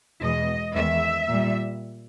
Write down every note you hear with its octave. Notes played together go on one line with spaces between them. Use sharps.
E2 B2 G#3 D#5
E2 D#3 G#3 E5
A#2 G3